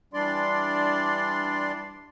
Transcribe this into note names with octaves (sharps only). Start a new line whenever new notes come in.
E3 G3 D4 D5 C6